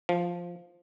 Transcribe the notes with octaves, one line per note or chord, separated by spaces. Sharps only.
F3